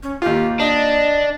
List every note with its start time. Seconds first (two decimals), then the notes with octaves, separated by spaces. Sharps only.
0.03 C#4
0.22 D#2 F4 G4
0.60 D4 D#5